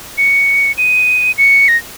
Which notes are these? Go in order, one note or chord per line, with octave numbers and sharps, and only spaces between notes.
C#7
D#7
C#7
A#6